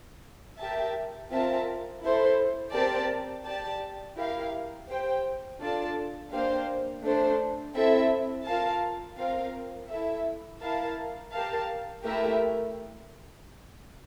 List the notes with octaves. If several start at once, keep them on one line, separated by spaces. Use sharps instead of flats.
G4 A#4 E5 A5
C4 F4 A#4 E5 A5
E4 A4 C5
C4 G4 A#4 D5 A5
G4 D5 A5
E4 G4 A#4 F5
G4 C5 G5
D4 F4 A4 D5 A5
A#3 D4 G4 C5 F5
A3 D4 A4 C5
C4 E4 A4 E5
F4 A#4 F5 A5
C4 F4 A#4 F5
E4 A4 E5
E4 A#4 F5 A5
G4 A#4 F5 A5
A3 E4 G4 A#4 E5